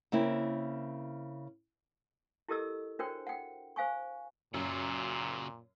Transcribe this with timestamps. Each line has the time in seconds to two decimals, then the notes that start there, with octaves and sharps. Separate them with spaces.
0.12 C#3 A#3 C4 E4
2.48 E4 G4 A4 A#4 D#5 E6
2.99 D4 F#4 A#4 C5 C#5 G5
3.27 F#5 G5
3.76 C5 F5 G#5 C#6
4.54 F#2 A#2 C#3 F#3